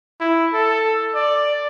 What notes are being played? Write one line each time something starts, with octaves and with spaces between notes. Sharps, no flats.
E4
A4
D5